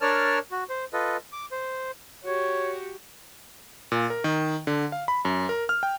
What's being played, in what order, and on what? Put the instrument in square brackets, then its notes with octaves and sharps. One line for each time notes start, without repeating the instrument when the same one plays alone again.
[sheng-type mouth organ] D4 A#4 C#5 D5 A5 F6
F#4
C5
F4 A4 B4 D#5
D6
C5
[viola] F#4 G4 [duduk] C#5
[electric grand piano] A#2
A#4
D#3
D3
F5
B5
F#2
A#4
F6
G5